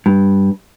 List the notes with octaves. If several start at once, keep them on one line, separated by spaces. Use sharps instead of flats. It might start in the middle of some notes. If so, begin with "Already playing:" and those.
G2